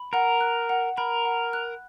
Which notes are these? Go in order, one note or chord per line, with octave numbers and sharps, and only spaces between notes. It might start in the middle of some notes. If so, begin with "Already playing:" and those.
Already playing: B5
A#4 F#5
F#6
F#5
A#4 B5
F#5
F#6